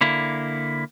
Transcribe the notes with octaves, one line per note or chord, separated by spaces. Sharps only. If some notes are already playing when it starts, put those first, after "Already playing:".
D3 A#3 E4